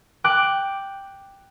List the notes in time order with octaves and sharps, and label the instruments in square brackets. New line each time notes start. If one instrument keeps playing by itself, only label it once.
[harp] G5 D6 F#6